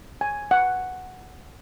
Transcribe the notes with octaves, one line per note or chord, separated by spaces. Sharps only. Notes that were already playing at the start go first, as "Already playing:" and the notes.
G#5
F#5